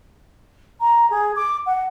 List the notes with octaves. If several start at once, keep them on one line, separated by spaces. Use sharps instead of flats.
A#5
G#4
D6
F#5